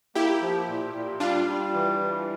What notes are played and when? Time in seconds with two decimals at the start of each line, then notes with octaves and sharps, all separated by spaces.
0.15 A#3 E4 G4
0.42 F3
0.68 A#2
0.95 A#2
1.20 G3 D4 F4
1.46 G3
1.74 E3
2.00 E3